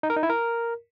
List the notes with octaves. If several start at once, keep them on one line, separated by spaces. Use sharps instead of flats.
D#4
A#4
D#4
E4
A#4